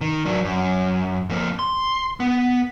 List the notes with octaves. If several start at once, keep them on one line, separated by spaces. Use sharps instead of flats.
D#3
F#3 D4
F#2
F2 A#3
C6
B3